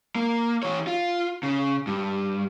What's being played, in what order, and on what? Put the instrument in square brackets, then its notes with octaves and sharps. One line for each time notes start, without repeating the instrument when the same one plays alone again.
[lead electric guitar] A#3
E3 C#5
F4
C#3
G2